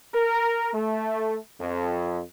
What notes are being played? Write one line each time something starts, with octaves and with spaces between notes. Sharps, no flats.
A#4
A3
F2